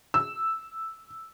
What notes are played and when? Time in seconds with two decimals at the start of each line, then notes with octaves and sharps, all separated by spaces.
0.14 E6